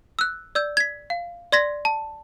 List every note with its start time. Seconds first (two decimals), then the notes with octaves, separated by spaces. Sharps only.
0.19 E6 F#6
0.55 D5 E6 G6
0.77 G#6 B6
1.10 F5
1.52 D5 C6 G#6 A#6 B6
1.85 A5